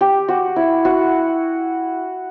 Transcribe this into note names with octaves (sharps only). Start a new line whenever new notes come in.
G4
F#4
E4
F#4